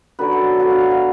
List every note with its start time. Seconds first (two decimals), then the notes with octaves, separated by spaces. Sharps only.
0.19 F#2 D3 F#3 B4
0.32 A4
0.60 D3 F#3 B3 F#5
0.70 F5
0.81 F#5
0.91 F5